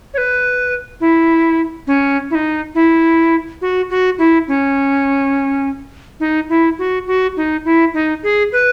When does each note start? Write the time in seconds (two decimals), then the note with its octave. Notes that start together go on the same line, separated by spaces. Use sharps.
0.14 C#5
0.18 B4
1.00 E4
1.87 C#4
2.31 E4
2.35 D#4
2.75 E4
3.61 F#4
3.90 F#4
4.18 E4
4.48 C#4
6.20 D#4
6.49 E4
6.78 F#4
7.07 F#4
7.37 D#4
7.65 E4
7.94 D#4
8.23 G#4
8.52 B4